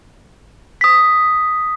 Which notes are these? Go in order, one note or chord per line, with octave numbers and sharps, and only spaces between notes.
D#6 B6